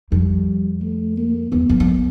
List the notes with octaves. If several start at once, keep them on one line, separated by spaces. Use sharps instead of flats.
F2 G3
A3
A#3
E2 B3
F2
F2